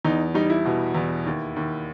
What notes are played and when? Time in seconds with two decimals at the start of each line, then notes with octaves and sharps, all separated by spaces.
0.05 E2 D#4
0.34 G3 D#4
0.50 E4
0.65 B2
0.95 E2
1.26 D#2
1.56 D#2